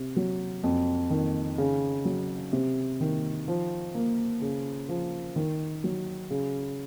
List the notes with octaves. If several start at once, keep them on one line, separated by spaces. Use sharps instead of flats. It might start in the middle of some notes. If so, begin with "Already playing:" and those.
Already playing: C3
F#3
F2
D#3
C#3
F#3
C3
D#3
F3
A#3
C#3
F3
D#3
F#3
C#3